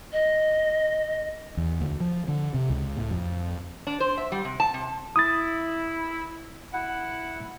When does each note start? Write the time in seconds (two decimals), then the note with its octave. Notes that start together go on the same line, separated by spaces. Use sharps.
0.13 D#5
1.57 E2
1.81 D2
2.00 F3
2.28 D3
2.54 C3
2.70 C#2
2.97 A2
3.11 F2
3.87 D4
4.00 C5
4.17 E5
4.32 G3
4.45 C3
4.60 A5
4.74 C3
5.16 E4 D#6 A6
6.73 E4 F#5